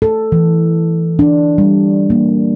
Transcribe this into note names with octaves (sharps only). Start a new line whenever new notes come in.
A4
E3
D4
G3
A#3